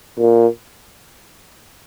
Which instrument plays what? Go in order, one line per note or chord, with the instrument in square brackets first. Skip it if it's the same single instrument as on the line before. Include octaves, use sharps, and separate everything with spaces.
[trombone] A#2